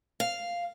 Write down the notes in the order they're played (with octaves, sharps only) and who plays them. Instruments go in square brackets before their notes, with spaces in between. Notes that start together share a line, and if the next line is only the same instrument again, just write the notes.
[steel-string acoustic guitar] F5